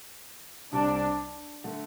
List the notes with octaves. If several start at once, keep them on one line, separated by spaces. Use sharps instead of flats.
C2 C3 G3 D4
D3 A3